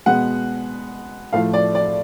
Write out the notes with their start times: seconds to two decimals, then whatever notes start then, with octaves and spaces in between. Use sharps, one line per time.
0.06 B2 G#3 B3 F#5
1.33 A2 F3 A3 F5
1.54 D5
1.75 D5